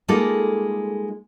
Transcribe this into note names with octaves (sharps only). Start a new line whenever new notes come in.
G3 G#3 A#3 D#4 F4 A4